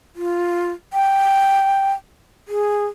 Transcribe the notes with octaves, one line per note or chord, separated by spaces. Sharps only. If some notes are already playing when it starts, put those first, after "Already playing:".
F4
G5
G#4